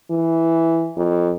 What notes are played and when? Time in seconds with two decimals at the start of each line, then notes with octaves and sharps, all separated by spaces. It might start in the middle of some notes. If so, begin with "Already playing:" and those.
0.11 E3
0.97 F2